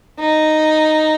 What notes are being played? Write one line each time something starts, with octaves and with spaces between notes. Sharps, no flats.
D#4